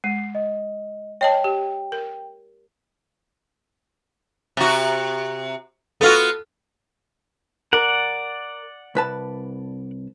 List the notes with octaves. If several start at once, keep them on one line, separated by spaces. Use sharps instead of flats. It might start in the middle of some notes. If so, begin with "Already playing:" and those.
G#3 C7
D#5
C#5 D#5 G5 A5
G4
A#4
C3 F#4
B3 F4 F#4 A4
A#4 D5 F#5
C2 B4 A5